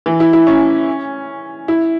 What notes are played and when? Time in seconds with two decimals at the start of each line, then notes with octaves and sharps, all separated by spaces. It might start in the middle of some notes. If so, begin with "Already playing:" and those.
0.06 E3
0.20 E4
0.33 E4
0.47 C#4
1.68 E4